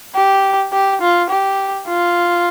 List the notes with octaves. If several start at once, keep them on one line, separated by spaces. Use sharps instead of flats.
G4
G4
F4
G4
F4